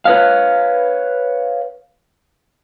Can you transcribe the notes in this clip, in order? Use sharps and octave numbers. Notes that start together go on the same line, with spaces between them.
B4 C#5 F5